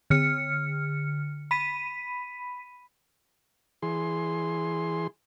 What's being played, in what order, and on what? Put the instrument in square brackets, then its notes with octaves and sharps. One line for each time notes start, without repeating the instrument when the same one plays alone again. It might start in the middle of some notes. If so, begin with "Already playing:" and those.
[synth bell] D3 F6 C#7
B5 B6 D#7
[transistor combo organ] E3 G#4 C6